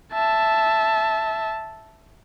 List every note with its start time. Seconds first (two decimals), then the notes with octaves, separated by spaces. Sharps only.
0.13 E5 A5